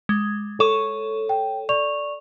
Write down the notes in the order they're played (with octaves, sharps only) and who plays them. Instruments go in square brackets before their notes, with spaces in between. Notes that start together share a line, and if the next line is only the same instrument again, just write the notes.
[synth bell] G#3
[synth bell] A4 [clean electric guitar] C#5
[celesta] G5
D5 C#6 F7